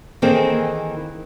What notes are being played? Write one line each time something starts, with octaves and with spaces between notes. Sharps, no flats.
D#3 E3 A#3 C4 G#4 A4